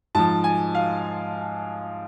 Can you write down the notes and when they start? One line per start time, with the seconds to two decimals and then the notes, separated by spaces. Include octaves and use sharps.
0.15 G#2 F3 A5
0.44 G#5
0.75 F5